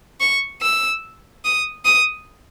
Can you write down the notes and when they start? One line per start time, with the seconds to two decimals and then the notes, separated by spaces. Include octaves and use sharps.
0.21 C#6
0.62 E6
1.45 D#6
1.85 D#6